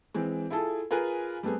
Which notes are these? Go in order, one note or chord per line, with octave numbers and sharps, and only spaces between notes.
E3 G#3 C4
E4 F4 G#4 A4
F4 G#4 A#4 B4 G#5
G3 A3 B3 C4 G#4